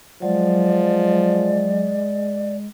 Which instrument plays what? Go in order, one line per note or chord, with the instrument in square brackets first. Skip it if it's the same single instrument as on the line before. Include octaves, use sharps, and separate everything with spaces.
[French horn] F3 [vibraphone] F#3 [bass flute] G#3 [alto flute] D5